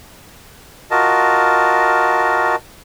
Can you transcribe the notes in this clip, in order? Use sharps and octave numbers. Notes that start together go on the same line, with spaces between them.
F4 F#4 A#4 D#5 A5